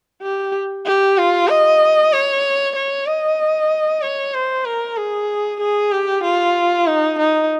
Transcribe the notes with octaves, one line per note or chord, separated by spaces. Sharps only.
G4
G4
F4
D#5
C#5
C#5
D#5
C#5
C5
A#4
G#4
G#4
G4
F4
D#4
D#4